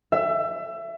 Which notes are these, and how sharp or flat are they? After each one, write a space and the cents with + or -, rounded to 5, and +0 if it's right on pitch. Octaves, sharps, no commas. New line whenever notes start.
E5 +25